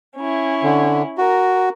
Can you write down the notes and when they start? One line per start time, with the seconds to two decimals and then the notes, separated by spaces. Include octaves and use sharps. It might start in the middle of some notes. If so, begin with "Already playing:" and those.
0.16 C#4 E4
0.63 D3
1.18 F#4 A#4